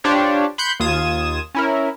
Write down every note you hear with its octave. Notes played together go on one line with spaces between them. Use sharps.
D4 F4 G4 C5 C#5
B5 C6 F#6 G6 C#7
D#2 F4 D#6 G#6 E7
C#4 E4 A#4